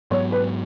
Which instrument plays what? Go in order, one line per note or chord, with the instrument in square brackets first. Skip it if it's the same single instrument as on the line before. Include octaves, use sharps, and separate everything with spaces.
[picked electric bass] G#2 F#3 B3 [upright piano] C#5
[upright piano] B4